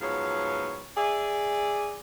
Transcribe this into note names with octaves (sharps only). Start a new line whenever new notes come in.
G#2 F3 F#3 B3 C#5 F5
G#4 D5 E5